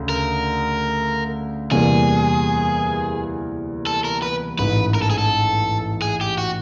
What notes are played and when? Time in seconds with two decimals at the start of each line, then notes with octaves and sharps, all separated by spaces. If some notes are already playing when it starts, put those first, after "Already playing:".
Already playing: D2 C#3
0.09 A#4
1.71 E2 C3 E3 G3 A#3 G#4
3.87 A4
4.05 A#4
4.22 B4
4.58 A1 G#2 E3 B4
4.94 A#4
5.02 A4
5.10 G#4
5.18 A4
6.02 G#4
6.21 G4
6.38 F#4